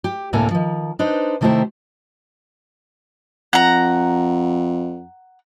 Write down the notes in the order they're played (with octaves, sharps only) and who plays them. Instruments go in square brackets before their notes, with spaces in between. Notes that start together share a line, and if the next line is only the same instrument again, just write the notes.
[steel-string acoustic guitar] G4
D2 A2 C3 A#3 A4 G#5
D#3 F3
D4 D#4 B4 C5
C3 D#3 A3 E4 G4 C5
[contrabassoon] F2 [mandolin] F#5 A#5